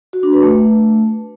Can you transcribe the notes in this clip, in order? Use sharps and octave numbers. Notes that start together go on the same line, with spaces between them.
F#4
D4
B4
A3